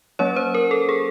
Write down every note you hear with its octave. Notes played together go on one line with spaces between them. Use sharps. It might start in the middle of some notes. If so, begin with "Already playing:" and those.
F#3 A#3 C#4 C#5
C5
A#4
A4
G#4